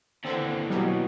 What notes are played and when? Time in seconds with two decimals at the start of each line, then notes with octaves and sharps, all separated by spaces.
0.25 D#2 D3 E3 C4 A4
0.70 B2 F#3 G3